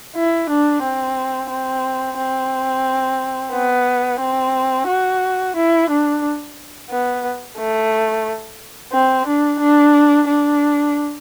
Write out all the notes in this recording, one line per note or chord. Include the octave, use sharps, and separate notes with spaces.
E4
D4
C4
C4
C4
B3
C4
F#4
E4
D4
B3
A3
C4
D4
D4
D4